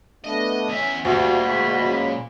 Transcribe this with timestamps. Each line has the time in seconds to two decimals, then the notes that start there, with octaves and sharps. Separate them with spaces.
0.24 A3 B3 D4 D#5
0.69 E2 C#4 E5
1.05 D2 A#2 G3
1.42 G#3 F#4 B5
1.77 C#3 F#3 G#3